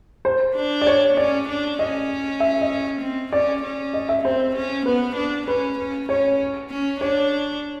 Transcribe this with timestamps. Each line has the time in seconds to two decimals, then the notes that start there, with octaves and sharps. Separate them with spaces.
0.25 C5
0.55 D4
0.81 D5
0.87 C#5
1.17 C#4 D5
1.48 D4
1.79 C#4 D#5
2.40 E5
2.61 D#5
3.02 C4
3.32 C#4 D5
3.63 C#4
3.94 D#5
4.09 E5
4.25 C4 C5
4.56 C#4
4.86 B3 B4
5.16 D4
5.47 C#4 B4
5.78 C#4
6.09 C#4 C#5
6.70 C#4
7.00 D4 C#5